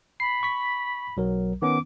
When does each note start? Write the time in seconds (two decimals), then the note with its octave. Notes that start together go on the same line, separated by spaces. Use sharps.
0.20 B5 C7
0.43 C#6 B6
1.17 B1 F#3 A#4
1.62 D#3 B3 C#4 D6